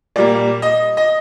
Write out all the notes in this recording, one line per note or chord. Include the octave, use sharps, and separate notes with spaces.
A#2 G3 A#3 D5
D#5
D#5